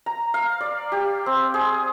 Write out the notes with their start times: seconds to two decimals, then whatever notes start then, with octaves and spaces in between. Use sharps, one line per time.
0.06 A#5
0.34 F5
0.61 D5
0.92 G4
1.26 C4
1.54 G#4